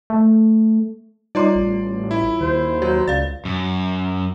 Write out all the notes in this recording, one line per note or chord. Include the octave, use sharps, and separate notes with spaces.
A3
G3 D#4 F4 C#5 D5 C6 D6
A1
E4
D#2 C5
F#3 F#4
C#2 D5 F5 A6
F#2